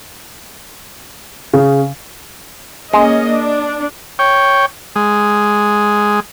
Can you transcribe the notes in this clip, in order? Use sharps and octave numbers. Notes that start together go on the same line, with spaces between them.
C#3
G#3 A#3 C#4 D#5
D4
C#5 G5
G#3